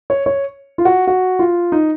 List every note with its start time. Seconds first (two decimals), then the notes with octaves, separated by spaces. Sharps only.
0.10 C#5
0.26 C#5
0.78 F4
0.85 F#4
1.07 F#4
1.39 F4
1.72 D#4